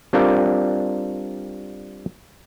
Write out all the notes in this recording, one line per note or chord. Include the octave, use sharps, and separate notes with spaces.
G3 C4 D4 F4 A#4 D5